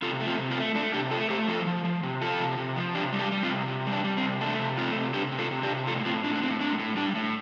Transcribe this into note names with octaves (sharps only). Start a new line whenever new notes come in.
C3 F4 A4
A3
C4 F4
C3
C4 F4
A3
A3 D4
C3 D4 G4
A3 F4 A4
A3 G4 C5
F3 F4 A4
F3
F3
C3
F3 F4 A4
C3
C3
F3
C3 D4 G4
G3
D4 G4
G3
C4 F4
C3
C3
G3
D4
G3
C4
C3
A3 D4
C3
A3 C4 F4
C3
C3 D4 G4
C3
F4 A4
C3
D4 G4
C3
A2 F4 A4
A2 C4 F4
A2 D4
D4
A2 C4
A2 D4
A2
G3 D4
A2